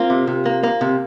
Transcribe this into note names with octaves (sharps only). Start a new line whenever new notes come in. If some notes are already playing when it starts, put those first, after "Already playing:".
Already playing: A#3 C4 F4
C3
C3
A#3
A#3
C3